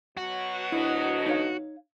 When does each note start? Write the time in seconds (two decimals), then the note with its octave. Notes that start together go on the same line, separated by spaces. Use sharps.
0.17 B2 F#3 F#4
0.72 D2 D4 E4 D#5
1.26 D#4 C#5 F5